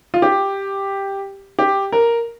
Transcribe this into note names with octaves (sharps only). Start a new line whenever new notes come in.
F4
G4
G4
A#4